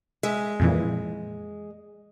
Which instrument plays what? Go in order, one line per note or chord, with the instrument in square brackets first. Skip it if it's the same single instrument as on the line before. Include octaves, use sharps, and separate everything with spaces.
[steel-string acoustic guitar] G#3 [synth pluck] E5
[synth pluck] F2 A#2 E3